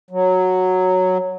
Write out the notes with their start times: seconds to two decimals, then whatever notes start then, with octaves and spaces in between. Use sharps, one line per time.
0.11 F#3